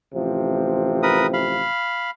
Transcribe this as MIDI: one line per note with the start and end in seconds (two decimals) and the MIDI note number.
0.14 1.66 33
0.14 1.66 48
0.14 1.66 53
1.03 1.27 70
1.03 1.27 71
1.03 1.27 87
1.34 2.10 77
1.34 2.10 83